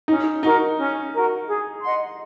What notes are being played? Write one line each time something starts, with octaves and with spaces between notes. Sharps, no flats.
C#4 D#4
D#4 F#4 A#4
C#4
F#4 A#4
G#4
D#5 F#5 C6